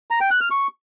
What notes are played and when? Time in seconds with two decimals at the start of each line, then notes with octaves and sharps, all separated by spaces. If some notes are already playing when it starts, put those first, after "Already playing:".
0.11 A#5
0.21 G5
0.31 F#6
0.41 F6
0.51 C#6